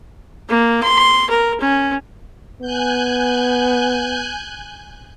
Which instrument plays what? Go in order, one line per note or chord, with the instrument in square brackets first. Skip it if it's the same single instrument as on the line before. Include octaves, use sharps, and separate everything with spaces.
[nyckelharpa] A#3
C6
A#4
C#4
[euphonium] B3 [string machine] G#5 F#6 G6